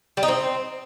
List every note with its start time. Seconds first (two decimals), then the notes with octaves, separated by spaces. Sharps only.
0.17 G3
0.23 D#4
0.28 C4